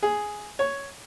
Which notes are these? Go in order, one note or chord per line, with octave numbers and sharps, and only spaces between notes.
G#4
C#5